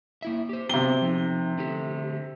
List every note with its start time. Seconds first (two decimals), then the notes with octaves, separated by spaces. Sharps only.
0.22 A#3 E4 E5
0.49 G4 C5
0.69 C3 F#3 B3 G5 G7
1.02 F3 D#4
1.58 D3 A3 G4